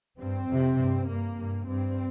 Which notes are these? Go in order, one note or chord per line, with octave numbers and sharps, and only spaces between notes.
G2 C4
F2 C3
G2
G2 A#3
G2
G2 C4